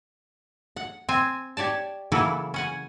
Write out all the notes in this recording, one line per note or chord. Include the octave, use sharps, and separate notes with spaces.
F#5
C4 G#5
G4 C#5 D5 A5
C#3 E3 F#3 A#3 E4 A4
C#4 F#5 G#5